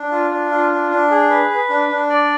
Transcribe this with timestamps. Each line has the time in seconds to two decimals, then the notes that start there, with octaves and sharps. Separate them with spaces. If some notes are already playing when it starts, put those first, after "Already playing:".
Already playing: D4
0.11 F4
0.31 D4
0.51 F4
0.71 D4
0.90 D4
1.11 G#4
1.30 B4
1.50 B4
1.70 D4
1.89 D4
2.09 D5